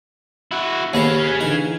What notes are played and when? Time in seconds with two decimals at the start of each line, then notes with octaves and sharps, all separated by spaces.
0.51 E4 F#4 E6 F#6
0.94 D#2 G#4 B4 F5 A#5
1.24 F#6 G#6 B6
1.41 D3 E3 D#4 G#5